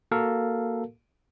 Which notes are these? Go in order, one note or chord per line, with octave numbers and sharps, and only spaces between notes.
A#3 F#4 A4 A#4 F5